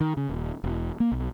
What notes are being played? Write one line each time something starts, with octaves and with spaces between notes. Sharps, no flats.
D#3
C#3
D#1
E1
A#3
B1